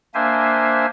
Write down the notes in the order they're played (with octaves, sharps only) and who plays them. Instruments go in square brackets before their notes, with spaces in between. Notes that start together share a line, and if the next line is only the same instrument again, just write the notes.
[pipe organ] A#3 D4 C5 E5 G#5